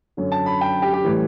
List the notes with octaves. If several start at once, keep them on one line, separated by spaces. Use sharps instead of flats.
F#2 D3 F#3
A5
B5
G5
G4
G4
A2 E3 G3